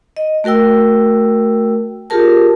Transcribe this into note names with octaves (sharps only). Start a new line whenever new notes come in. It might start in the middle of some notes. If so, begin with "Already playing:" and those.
D#5
A3 F#4 A#4 G5 E6
F4 G4 G#4 A#4 A5